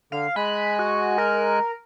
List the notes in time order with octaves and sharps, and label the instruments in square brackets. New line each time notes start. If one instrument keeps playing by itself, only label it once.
[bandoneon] D3 [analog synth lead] F5
[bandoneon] G#3 G#5 F#6 [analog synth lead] B5
[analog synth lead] F#4
A#4